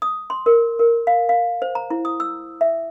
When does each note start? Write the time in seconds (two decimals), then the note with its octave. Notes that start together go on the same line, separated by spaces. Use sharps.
0.02 D#6
0.30 C6
0.46 A#4
0.79 A#4
1.07 F5
1.29 F5
1.62 C5
1.75 A#5
1.90 E4
2.05 D#6
2.20 E6
2.61 E5